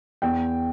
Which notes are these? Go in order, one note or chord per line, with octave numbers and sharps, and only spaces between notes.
E2 G5